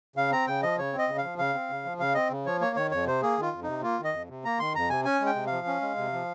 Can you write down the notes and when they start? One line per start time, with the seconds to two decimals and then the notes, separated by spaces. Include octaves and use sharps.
0.16 C#3 F5
0.31 C4 A#5
0.47 C#3 G5
0.62 F3 D#5
0.78 C#3 C#5
0.93 C4
0.98 D#5
1.08 C#3
1.18 F5
1.23 F3
1.38 C#3 F5
1.54 C4
1.70 C#3
1.85 F3
1.99 C#3 F5
2.15 C4 D#5
2.30 C#3
2.46 F3 C#5
2.61 A#3 C#5
2.76 D#3 C#5
2.91 F2 C#5
3.06 C3 C5
3.22 A#3 G#4
3.38 D#3 F4
3.53 F2
3.63 C3 D#4
3.83 A#3 F4
3.99 D#3
4.04 D#5
4.13 F2
4.29 C3
4.45 A#3 A#5
4.59 D#3 C6
4.75 F2 A#5
4.90 C3 G#5
5.05 C#4 G#5
5.20 G#3
5.26 G5
5.35 C3
5.47 F5
5.52 F3
5.67 C#4
5.81 G#3
5.97 C3
6.13 F3